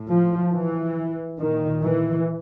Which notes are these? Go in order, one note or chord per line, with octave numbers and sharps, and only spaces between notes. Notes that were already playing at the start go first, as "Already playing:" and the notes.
Already playing: A2
F3
E3
A#2 D#3
E3